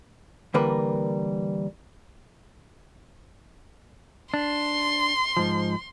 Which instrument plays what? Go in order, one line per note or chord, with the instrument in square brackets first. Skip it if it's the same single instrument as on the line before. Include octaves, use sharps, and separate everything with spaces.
[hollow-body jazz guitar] D3 E3 G3 A#3 A#4 B4
[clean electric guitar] D4 [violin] C6
[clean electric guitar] G#2 F3